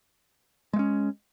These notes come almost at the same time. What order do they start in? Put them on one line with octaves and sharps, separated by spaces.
G#3 A3 C#4